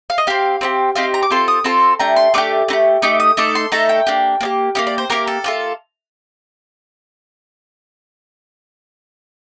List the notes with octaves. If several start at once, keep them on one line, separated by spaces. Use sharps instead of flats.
F5
D#5
C4 G4 F5
C4 D#4 G4
C4 D#4 G4 F5
A#5
D6
C4 F4 A4 C6
D#6
C4 F4 A4 C6
A3 D4 G4 A#5
C6
A3 D4 G4 D6
A3 D#4 G4
A3 D#4 G4 D6
D#6
A3 D#4 A4 D6
C6
A3 D#4 A4 A#5
G5
A#3 D4 G4
A#3 D4 G4
A#3 D#4 G4 F5
D5
C5
A#3 D#4 G4 A#4
A4
A#3 F4 A4